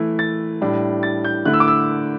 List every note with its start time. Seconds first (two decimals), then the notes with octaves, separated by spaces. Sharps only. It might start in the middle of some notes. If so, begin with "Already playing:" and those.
Already playing: E3 A3 E4
0.19 A6
0.61 A2 G3 D4
1.03 A6
1.25 G6
1.45 D3 A3 E4 F#6
1.53 E6
1.60 D6
1.68 E6